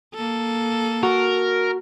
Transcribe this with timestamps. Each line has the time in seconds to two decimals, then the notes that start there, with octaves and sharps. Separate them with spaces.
0.15 A#3 A4
1.03 F#4 A#4